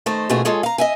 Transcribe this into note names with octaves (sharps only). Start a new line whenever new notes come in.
D#3 A3 D#4 A4 C5
B2 E3 A3 C4 F4 G#4
G#3 F4 G#4 A4 C#5
F5 A#5
D#5 E5 G#5